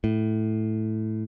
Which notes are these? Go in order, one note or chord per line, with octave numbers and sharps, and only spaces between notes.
A2